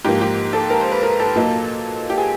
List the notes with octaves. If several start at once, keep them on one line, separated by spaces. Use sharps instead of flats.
G#2 F3 A#3 G4
G4
A4
A#4
C5
B4
A#4
A4
A#2 F#3 A#3 D#4
G4
G#4